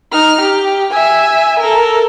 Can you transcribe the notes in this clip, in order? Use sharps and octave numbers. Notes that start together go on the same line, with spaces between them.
D#4 F6
G4
E5 G#5
A4 A#4